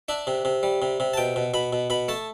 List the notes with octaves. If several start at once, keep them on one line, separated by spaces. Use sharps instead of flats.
D4 E5
C3
C3
G3
C3
C3
A5
B2 G5
B2
B2 B5
B2
B2 B5
A3 A5